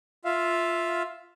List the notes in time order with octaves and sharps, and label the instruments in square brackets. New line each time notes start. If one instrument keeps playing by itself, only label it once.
[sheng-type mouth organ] F4 E5 F5